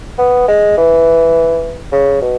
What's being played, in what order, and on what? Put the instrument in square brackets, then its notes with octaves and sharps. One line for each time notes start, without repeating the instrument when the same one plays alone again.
[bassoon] B3
G#3
E3
C#3
B2